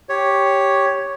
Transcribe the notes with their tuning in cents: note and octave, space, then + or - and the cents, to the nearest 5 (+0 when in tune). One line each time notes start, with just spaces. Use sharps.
G4 +0 C#5 +0